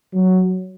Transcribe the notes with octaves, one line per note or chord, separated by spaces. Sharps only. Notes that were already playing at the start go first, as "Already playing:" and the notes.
F#3